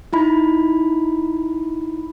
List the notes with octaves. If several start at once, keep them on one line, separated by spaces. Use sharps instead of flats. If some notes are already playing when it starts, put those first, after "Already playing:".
D#4 E4 B5